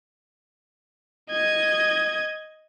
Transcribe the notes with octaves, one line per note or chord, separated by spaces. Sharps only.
D#5 G#6